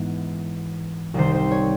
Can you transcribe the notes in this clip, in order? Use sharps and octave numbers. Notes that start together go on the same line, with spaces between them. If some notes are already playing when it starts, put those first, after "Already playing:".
Already playing: G#2 E3 B3
C2 C3 D#3 G3 C5
C5
C#5